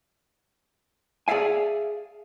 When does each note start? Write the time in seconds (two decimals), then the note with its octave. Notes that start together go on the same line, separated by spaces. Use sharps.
1.28 G#4 D5 E5 F5 G#5